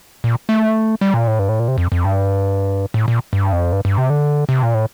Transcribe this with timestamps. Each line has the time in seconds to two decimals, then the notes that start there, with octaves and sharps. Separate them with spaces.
0.24 A#2
0.49 A3
1.01 G3
1.14 A#2
1.27 A2
1.39 G2
1.49 A2
1.60 A#2
1.68 C3
1.78 F2
1.92 F2
2.05 G2
2.94 A2
3.08 A#2
3.33 G2
3.52 F2
3.72 G2
3.85 G2
3.98 C3
4.10 D3
4.49 C3
4.63 A#2
4.74 A2